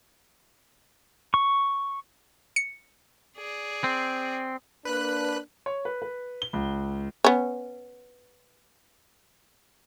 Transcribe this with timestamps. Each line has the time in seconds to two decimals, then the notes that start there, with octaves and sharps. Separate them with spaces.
1.34 C#6
2.56 C#7
3.37 G#4 D5
3.84 C4
4.85 A#3 D4 B4 F#6
5.66 C#5
5.85 B4
6.02 B4
6.42 G7
6.53 C#2
7.24 B3 C#4